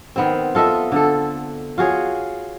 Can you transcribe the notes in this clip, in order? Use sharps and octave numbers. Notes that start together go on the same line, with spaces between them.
D#3 B3 C4
F4 A4 D#5 E5
D3 A4
F4 F#4 G#4 C#5